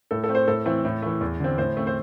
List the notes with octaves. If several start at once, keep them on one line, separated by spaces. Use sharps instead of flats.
A2 A4
A4
A3 C4
C5
A2 A4
E3 A3 C4
A2
E3 A3
E2
D3 C4
A2 C5
A3 C4
C5